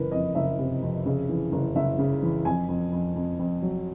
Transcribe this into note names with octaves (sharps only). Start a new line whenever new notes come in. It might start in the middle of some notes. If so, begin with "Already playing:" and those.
Already playing: F#1 E3 A#4 B4
F2 D#5
F#1 E5
C3
F2
C#3
E3
F#1
F#1 E5
C#3
E3
F2 G#5
F2
F2
F2
F2
F#3